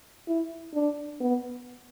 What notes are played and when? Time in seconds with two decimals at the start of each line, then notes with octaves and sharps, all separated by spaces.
0.28 E4
0.74 D4
1.20 B3